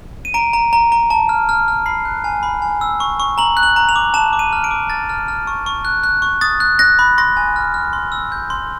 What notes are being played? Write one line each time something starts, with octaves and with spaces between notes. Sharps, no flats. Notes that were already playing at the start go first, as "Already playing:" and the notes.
D#7
A#5 D7
A#5
A#5
A#5
A5
F6
F6
F6
B5 C7
F#6
G#5
B5
G#5
E6
C#6
C#6
A#5 F#7
F#6
F#7
A#5
F7
D6
A5 E7
D6
D#7
F6
D7
D6
F6 A6
F6
F6
C#6
C#6
F#6
F#6
C#6
D#6 A6
F#6
F#6 A#6
B5
C6 A#6
G#5
F6
F6
C6
E6
G6
C6